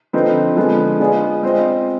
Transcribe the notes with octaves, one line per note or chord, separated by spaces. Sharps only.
D3 F3 C4 D#4 B4
D3 F3 G#3 B3
G#3 B3 F4 G#4 D5
C4 F4 C5 D#5